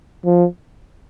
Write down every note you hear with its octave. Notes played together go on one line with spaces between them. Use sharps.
F3